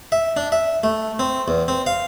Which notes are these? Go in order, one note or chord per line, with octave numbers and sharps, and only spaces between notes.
E5
D4
E5
A3
C4
E2
C4
F5